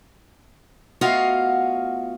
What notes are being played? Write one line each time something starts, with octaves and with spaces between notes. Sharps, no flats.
A3 B3 F4 F#4 D#5 F5